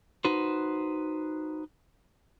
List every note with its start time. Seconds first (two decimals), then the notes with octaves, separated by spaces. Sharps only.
0.25 D#4 F#4 B4 C5